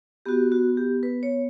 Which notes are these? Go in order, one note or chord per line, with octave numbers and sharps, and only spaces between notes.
B3 F#4 G4
F#4
G4
B4
C#5